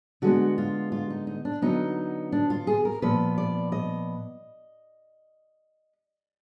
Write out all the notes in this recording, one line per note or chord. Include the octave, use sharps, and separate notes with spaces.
D3 G#3 B3 F#4
F4
F4
D#4
D#4
D4
D3 F#3 B3 D#4
D4
F4
G#4
A#4
A#2 F3 B3 B4
D5
D#5